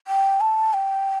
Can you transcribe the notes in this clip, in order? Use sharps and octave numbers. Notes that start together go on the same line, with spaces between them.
G5
A5
G5